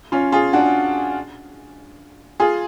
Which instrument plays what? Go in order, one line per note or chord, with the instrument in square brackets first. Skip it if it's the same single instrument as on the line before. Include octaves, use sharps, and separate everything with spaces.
[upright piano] C#4 F4
F4 G#4
D4 F#4
F4 G#4